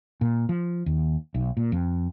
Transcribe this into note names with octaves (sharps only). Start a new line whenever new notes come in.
A#2
F3
D#2
B1
A#2
F2